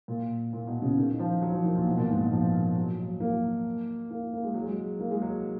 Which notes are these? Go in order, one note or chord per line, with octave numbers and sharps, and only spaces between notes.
A#2
A#2
B2
C#3
D#3
F3
F#3
F3
D#3
A#2
B2
A#2
G#2
B2
F3
F#3
F#3
A#3
A#3
A#3
G#3
F#3
G#3
A#3
G#3
F#3